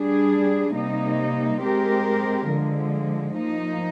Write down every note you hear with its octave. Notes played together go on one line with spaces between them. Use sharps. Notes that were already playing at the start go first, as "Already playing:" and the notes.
Already playing: G3 D4 G#4
C3 G3 A#3 D#4
G#3 C4 G4 A#4
D3 F3 G#3
F3 A#3 D#4